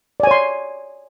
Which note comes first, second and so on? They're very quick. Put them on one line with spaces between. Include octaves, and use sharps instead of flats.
D5 G#5 C#5 C6